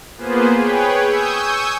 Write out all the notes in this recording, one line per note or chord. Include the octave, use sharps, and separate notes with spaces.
A#3 B3 F4 G#4 B4 C5
G#4 B4 C#5 G5
G#5 C#6 D#6 E6 G6